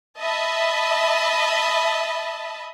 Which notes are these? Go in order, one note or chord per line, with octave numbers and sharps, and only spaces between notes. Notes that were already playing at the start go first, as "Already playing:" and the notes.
D#5 E5 A5 B5